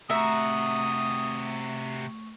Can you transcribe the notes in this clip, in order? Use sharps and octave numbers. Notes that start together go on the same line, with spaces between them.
C3 A3 F#4 E5 A#5 C#6 D#6